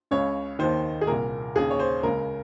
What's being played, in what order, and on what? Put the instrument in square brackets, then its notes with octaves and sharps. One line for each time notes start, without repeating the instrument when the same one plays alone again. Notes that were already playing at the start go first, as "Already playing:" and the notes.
[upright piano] C#2 C#3 C#5
D#2 D#3 C5
G#4
C2 A#2 A#4
D#2 C#3 G#4
C#5
C5
C#2 C#3 A#4